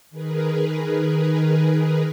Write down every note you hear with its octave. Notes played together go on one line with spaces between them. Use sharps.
D#3 G#4 A#4 B4